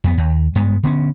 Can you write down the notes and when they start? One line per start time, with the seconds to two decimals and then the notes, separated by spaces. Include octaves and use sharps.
0.04 F2 B3
0.18 D#2
0.55 G2 G#3 B3
0.83 D3 B3 C#4